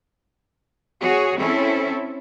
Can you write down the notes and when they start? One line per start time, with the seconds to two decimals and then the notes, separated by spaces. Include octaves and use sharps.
1.00 F#4 G#4 C#5
1.37 C4 C#4 E4 A4